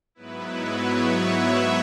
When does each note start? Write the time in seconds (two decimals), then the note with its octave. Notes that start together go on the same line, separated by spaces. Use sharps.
0.15 G#2 F#3 B3 E4 B4
0.54 C#5
0.93 E5
1.31 C#5